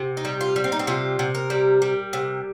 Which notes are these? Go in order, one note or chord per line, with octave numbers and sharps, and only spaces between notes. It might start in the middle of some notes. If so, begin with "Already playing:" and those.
Already playing: C3
D#4
G3
F4
G3
C4
D#4
C4
C3 F4
C3
A#4
G3
G3
C3